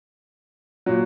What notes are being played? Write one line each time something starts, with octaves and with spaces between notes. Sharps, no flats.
A#2 F#3